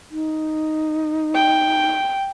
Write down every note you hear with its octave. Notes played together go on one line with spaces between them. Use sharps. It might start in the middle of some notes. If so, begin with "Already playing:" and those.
D#4
G5